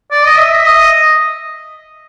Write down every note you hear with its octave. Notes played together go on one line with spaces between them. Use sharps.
D5
D#5
E5
D#5